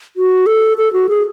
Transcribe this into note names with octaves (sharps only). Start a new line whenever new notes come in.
F#4
A4
A4
F#4
G#4